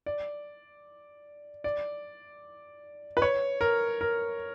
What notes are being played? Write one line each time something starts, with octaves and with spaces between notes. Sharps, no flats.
D5
D5
B4
C#5
A#4
A#4